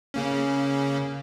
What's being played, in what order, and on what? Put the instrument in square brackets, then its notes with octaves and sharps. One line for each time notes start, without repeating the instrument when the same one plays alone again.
[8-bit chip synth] C#3 A#3 C#4